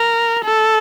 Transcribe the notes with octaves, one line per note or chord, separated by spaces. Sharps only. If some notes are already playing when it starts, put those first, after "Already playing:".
Already playing: A#4
A4